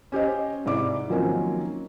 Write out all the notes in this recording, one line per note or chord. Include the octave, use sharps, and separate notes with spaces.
C#4 G4 C5 D#5
G#2 C3 E4 D5 D6
D#3 F3 F#3 A#3 C4 C#4